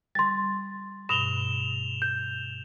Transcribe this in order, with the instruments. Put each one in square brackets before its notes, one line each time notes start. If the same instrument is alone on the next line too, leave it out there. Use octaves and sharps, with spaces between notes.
[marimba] G3 [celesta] C6 A6
[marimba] G2 B2 [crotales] E7 F7 G7
[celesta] G6